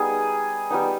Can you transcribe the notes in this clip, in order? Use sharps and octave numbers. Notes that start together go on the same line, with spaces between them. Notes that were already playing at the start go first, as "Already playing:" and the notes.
Already playing: G3 B3 D#4 G#4
G3 B3 D#4